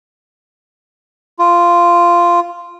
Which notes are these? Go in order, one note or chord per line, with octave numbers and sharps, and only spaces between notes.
F4